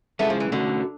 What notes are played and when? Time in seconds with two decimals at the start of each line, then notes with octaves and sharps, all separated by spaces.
0.19 G#3 A3 B3 C#4 E4 G#4
0.30 F3
0.40 E3
0.51 D3 A3 C#4 F#4